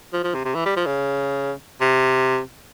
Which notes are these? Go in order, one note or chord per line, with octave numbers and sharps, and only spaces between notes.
F3
F3
C3
C3
E3
G3
F3
C#3
C3